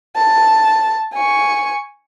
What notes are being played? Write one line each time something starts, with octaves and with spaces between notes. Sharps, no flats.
A5
G#5 C#6